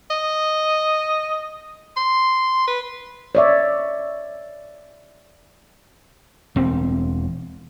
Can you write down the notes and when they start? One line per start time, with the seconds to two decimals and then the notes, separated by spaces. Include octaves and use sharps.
0.10 D#5
1.97 C6
2.68 B4
3.35 C#5 D5 E5
6.56 E1 C4